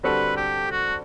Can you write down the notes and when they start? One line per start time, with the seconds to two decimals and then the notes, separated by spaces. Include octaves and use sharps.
0.03 D3 G3 C4 F#4 A4 B4
0.37 G4
0.71 F#4